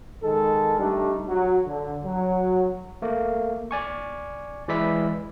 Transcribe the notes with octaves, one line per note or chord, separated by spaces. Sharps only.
D#3 G#3 A4
G3 A3 D4 D#4
F#3
D3
F#3
A3 A#3
D5 G#5 C#6
E3 G#3 D5 E5 B5 B6